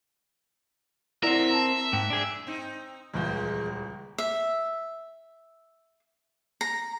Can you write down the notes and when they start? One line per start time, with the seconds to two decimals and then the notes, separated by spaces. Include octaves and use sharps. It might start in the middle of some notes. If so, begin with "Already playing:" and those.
1.23 C4 E4 A#4 D5 E5 F#5
1.50 A5 A#5
1.93 G#2 G5
2.10 D4 G#4
2.47 C4 D#4
3.13 D#1 C#2 E3 G#3 G6
4.18 E5
6.61 A#5